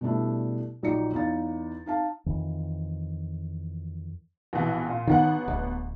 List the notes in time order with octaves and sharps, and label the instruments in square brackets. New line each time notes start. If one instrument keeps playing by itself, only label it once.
[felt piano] B2 G3 A3 D4 E4
A#1 F#3 D#4 D5 C#7
E2 D#4 F5 A6
D#4 F5 A5
[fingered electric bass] F2 D#3 E3
[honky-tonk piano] A#1 B2 E3
A#2
[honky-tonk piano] A1 B3 F#5 [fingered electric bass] D#3
[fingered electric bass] D1